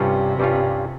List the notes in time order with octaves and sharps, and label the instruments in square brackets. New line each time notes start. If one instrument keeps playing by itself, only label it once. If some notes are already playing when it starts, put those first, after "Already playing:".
Already playing: [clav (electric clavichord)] G2 G3 C#4 F4 [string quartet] C3
[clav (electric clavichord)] G2 G3 C#4 F4